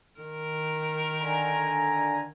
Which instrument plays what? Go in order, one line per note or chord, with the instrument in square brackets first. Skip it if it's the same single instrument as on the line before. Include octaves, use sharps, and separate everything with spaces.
[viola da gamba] D#3 A#4
[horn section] D3 G#5 A#5